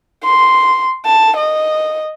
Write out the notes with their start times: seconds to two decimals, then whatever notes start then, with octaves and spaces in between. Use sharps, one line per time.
0.24 C6
1.06 A5
1.36 D#5